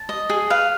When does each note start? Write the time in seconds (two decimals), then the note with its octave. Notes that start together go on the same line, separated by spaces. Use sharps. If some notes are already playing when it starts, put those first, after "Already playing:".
Already playing: A5
0.09 D#5
0.30 G#4
0.50 B4 F5